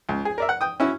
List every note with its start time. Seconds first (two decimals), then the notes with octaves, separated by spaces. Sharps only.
0.09 C#2
0.25 G#4
0.38 A#4 D5 E5
0.49 F#5
0.61 G5 D#6
0.80 C#4 E4 F#4